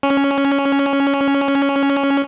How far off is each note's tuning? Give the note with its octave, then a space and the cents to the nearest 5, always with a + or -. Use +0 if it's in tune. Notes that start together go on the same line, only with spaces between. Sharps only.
C#4 +5